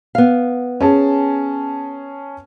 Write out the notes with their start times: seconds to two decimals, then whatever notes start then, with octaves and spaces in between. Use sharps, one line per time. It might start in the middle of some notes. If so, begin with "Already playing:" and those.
0.15 B3 F5
0.81 C#4 G#4 A5